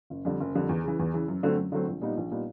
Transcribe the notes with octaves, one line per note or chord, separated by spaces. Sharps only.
F#1
F2 D3 G3
F#1
F2 D3 G3
E2
C#3 E3
E2
C#3 E3
F#2
D3 F#3 A3 C4
F#2
D3 F#3 A3 C4
A#1
A#2 G3 B3 D#4
A#1
A#2 G3 B3 D#4